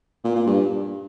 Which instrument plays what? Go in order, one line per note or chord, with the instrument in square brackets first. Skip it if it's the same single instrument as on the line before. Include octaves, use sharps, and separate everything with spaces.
[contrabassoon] A#2
A#2
G2